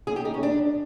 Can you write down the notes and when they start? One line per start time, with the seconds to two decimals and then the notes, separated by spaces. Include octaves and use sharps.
0.07 G#4
0.16 G4
0.25 D#4
0.34 C#4
0.43 D4